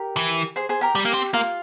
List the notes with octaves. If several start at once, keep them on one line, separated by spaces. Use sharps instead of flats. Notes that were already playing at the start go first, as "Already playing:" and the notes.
Already playing: G4 A#4
E3
G#4 C5
G#4 C5
G4 A#4
G3 G4
A#3
C4
A#3 F4